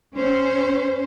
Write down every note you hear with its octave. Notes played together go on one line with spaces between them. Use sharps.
C#4 C5